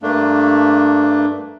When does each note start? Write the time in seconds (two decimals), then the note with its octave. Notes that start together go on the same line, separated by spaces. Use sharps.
0.03 G2 A3 A#3 D4